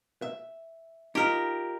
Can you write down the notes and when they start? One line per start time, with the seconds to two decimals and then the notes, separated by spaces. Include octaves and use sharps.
0.22 E5
1.15 D#4 F4 G4 A#4